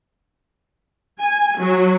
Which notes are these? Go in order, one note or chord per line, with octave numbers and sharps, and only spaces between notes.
G#5
F#3